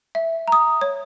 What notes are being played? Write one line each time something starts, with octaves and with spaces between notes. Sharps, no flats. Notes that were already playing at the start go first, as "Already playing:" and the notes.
E5
A#5 D#6
C#5